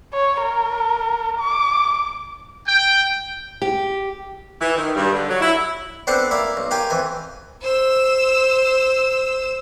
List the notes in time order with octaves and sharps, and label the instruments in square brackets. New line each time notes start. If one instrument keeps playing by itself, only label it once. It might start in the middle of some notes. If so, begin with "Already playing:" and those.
[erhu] C#5
A#4
D6
[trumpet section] G5
[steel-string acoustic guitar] G4
[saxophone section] E3
D#3
G2
D3
F#3
E4
[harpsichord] B3 C4 D4 A4 C5
E4 A#4 D5 F5
B1
F4 G4 A#4 G5 G#5
F2 E3 G#5
[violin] C5 E6